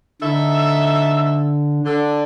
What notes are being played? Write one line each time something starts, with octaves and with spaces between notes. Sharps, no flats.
D3 D#4 A4 E5
D3